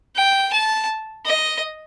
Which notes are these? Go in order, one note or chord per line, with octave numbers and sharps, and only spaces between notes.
G5
A5
D#5